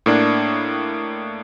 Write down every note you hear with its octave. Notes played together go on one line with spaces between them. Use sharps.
A2 A#3 D4